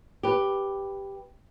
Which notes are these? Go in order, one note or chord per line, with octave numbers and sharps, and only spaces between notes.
G4 B4